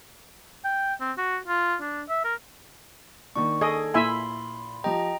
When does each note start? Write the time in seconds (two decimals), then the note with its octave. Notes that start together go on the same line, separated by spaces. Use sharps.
0.64 G5
1.01 C4
1.18 F#4
1.48 F4
1.81 D4
2.09 E5
2.24 A#4
3.35 D#3 A#3 D4 C#6
3.61 G#4 A4 D#5 G#6
3.94 A#2 E4 E5 G#5 B5 C6
4.84 F3 G4 D#5 G5 A#5